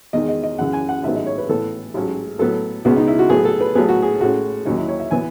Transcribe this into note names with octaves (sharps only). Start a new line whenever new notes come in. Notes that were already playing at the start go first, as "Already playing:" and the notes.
E2 D#3 G#3 D#5
D#5
D#5
F#2 C#3 E3 F#5
G#5
F#5
A1 G#2 D#3 F#3 B3 E5
D#5
C#5
B4
A2 E3 B3 A4
A1 G#2 F#3 C#4
A2 F#3 B3 A4
C#2 B2 G#3 B3 F#4
D#4
E4
F#4
A2 F#3 B3 G#4
A4
B4
A1 A2 F#3 B3 G#4
F#4
G#4
A2 G#3 C#4 F#4
D#2 D#3 F#3 C#4 D#4
E4
C#5
E5
E3 B3 G#5